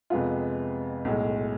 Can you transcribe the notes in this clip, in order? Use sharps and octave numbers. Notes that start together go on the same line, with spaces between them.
F2 C3 G#3 B3 F4
B1 A2 G#3